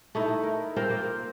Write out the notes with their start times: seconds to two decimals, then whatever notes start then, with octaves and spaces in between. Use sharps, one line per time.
0.15 A3 D#4 E4
0.43 A#4
0.76 C4 F4 A#4 C5
0.90 A#3